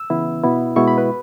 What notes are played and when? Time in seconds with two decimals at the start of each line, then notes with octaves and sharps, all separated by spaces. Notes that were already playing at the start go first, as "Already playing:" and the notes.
Already playing: E6
0.10 C#3 E3 B3 E4
0.43 B2 B3 E4
0.76 B2 G#3 B3 E4 C#6
0.88 B5
0.98 B4